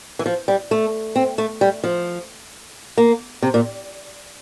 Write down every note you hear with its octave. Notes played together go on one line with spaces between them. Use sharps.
E3
F3
G3
A3
C4
A3
G3
F3
A#3
C3
A#2